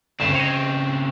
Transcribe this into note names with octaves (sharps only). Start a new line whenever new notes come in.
D2 G2 C#3 C4 E5
C#5 D#5